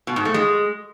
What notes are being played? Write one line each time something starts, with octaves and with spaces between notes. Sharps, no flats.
B2
G#2
A3
G#3